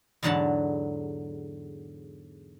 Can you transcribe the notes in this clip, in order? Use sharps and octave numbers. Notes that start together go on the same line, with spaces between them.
E2 G#2 D3 F#3 F#5 A5